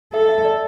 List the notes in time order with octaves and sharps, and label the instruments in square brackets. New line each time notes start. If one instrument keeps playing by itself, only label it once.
[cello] A4 [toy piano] E5
[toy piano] E5
D5